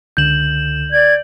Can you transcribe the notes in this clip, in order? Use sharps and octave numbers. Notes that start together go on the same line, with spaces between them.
C#2 D3 G6 E7 F#7
D5 G#6